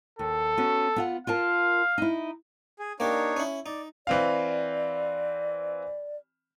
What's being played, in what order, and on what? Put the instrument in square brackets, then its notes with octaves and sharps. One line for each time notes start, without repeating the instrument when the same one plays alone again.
[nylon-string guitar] D#2 [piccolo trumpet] A4
[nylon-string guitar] B3 C#4 F#4
B3 F4 F#5
[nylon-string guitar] F4 A#4 A5 [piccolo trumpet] F5
[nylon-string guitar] D#4 E4
[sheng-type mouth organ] G#4
[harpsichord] A#3 G4 [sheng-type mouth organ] D4 D#4 C#5
[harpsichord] C#4 E4
[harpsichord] D#4 [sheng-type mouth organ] D5
[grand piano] E3 C4 F5 [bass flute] D5